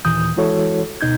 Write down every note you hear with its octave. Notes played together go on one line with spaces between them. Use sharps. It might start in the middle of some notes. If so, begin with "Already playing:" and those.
D#2 A#2 E3 D#6 G6
E3 G#3 E4 F#4 A4 C#5
D2 B2 D#4 G6 G#6